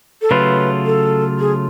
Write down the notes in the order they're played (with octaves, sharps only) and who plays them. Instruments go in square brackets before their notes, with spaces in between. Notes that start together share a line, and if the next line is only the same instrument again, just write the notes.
[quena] A4
[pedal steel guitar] C#3 F#3 A3 F4 [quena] B4
[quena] A4
G#4